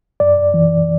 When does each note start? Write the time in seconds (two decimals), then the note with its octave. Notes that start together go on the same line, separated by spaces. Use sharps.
0.20 F#2 D5
0.54 E3